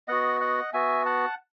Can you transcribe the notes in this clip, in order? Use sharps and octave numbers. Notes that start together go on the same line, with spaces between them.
B3 F#4 D#5 F#5
D#5 F#5
B3 F#4 E5 G#5
F#5 A5